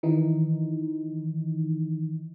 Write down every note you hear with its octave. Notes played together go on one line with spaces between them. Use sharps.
D#3 E3 D#4